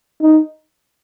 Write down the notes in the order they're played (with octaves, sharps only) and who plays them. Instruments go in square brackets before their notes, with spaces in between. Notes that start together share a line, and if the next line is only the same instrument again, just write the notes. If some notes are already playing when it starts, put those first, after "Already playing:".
[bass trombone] D#4